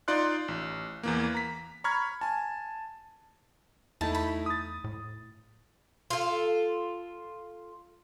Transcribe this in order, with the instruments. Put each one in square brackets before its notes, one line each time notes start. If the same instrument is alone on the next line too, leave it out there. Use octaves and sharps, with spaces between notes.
[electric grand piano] D#4 F4 D5 C6 F#6
A1
E2 E3 A#3
A#5 B6
A#5 B5 C#6 F6 G#6
G#5 A5
[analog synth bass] E2 [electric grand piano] A3 D#4 E4 [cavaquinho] A5
[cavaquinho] B5
[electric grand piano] D#6 A6
[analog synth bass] A2
[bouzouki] F4 A4